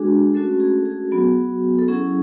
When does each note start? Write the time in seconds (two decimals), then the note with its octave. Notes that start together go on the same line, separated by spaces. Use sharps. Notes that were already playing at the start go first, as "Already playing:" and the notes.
Already playing: G#3 D4 F#4 G#4
0.34 A3 C#4 F#4 A4
0.60 G#4
0.86 G#4
1.11 F#3 B3 F#4
1.79 A4
1.88 F#3 C#4 E4 G#4